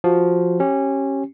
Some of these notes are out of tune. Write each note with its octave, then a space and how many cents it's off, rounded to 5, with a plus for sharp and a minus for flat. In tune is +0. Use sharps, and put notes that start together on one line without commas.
F3 +0 F#4 +0
C#4 -20 G4 -20